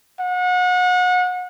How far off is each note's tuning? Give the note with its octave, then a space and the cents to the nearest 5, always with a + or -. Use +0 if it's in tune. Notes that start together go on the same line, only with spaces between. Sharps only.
F#5 -30